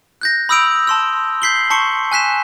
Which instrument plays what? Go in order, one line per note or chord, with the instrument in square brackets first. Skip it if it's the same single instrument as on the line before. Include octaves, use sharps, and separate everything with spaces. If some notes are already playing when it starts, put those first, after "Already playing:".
[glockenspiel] F#6 G6 A#6
B5 D#6 E6 G6 D7 F7
A5 C6 E6
G6 B6 C7 F#7 G7
A5 C6 C#6 C#7
G#5 F#6 B6 E7